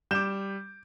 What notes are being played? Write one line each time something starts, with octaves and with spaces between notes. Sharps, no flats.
G3 D6 G6 E7